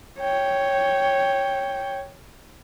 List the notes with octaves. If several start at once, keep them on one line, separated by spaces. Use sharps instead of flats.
C#5 G5